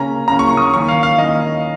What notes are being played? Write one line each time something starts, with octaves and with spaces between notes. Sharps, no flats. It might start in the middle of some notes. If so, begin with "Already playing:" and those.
Already playing: C#3 A#3 C#4 A#5
C#3 A#3 C#4 A#5
C#6
C#6
D#6
C#6
D#3 A#3 C#4 C#6
F5
F5
D#3 A#3 C#4 D#5